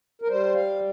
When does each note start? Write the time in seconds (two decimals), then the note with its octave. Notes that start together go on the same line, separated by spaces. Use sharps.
0.22 A#4
0.28 G3 C5
0.55 F5